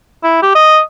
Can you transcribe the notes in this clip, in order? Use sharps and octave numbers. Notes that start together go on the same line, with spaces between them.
E4
G4
D#5